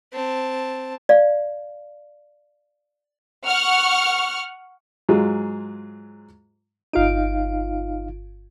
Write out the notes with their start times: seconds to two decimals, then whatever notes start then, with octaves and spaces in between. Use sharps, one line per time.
0.13 C4 A5
1.09 D5 F5
3.46 F#5 C#6 F6
5.09 G#2 F#3 F4 G#4
6.93 G1 D#4 F4 F5 D7